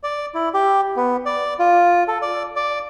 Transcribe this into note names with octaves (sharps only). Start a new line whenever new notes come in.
D5
E4
G4
B3
D5
F4
A4
D5
D5